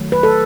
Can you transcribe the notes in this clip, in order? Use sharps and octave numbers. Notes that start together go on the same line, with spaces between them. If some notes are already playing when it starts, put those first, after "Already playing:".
Already playing: D#3 F#3 A3
B4
A4